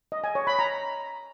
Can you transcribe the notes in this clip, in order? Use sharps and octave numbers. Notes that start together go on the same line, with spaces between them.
D#5
G#5
C#5
B5
A#5